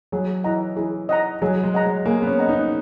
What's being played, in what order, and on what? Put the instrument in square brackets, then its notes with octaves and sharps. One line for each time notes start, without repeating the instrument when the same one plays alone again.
[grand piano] F#3 [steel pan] G#4
[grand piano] E3 [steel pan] D#5 F#5 A#5
[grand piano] E3 [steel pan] G#4
[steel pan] D#5 F#5 A#5
[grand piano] F#3 [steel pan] G#4
[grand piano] G#3
[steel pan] D#5 F#5 A#5
[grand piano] G#3
[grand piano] A#3 [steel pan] G#4
[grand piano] B3
C#4
[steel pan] D#5 F#5 A#5
[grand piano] D#4